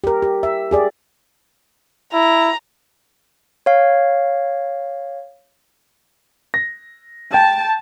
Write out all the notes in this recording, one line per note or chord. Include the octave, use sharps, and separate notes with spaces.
G4 A#4
G4
E5
G4 G#4 D5
E4 A#5
C#5 F5
A#6
G5 A5